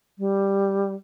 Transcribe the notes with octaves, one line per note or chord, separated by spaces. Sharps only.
G3